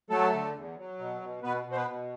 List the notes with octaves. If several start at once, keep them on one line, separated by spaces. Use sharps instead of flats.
F#3 A3 A4
D3
E2
F#3
B2
B2
B2 B3 B4
B2
C5
B3 B4
B2